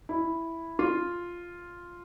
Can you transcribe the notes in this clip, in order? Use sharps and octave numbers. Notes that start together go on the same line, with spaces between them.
E4
F4